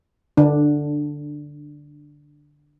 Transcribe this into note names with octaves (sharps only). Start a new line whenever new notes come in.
D3 D4